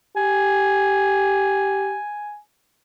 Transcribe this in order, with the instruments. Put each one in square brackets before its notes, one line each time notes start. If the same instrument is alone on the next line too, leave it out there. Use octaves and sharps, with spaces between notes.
[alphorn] G4 [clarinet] G#5